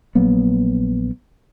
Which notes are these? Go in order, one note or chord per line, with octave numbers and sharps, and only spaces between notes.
A#1 F#3 A#3 B3